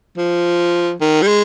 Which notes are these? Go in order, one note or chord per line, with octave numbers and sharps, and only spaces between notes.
F3
D#3
G3
G#3